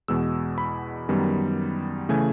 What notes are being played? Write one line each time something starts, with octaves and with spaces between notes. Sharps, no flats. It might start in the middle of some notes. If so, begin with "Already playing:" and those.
E2 B2 G#3 E6
B5
F#2 D#3 G3 B3
C#3 E3 A3 G#5